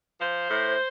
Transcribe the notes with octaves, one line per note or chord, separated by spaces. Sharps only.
F3 C5
A2